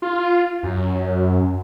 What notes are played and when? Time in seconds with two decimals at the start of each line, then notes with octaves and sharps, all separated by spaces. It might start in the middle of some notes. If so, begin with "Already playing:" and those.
0.02 F4
0.63 F#2